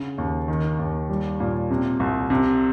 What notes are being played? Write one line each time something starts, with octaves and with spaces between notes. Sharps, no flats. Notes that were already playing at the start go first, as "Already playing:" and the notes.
Already playing: C#3
D#2
D#3
D#2
G3
A#2
C3
C2
C3